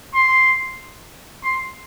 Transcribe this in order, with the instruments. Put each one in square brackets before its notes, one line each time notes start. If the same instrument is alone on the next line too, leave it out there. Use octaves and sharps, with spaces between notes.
[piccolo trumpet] C6
C6